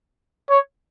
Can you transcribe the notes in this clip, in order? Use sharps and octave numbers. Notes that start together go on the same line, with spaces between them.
C#5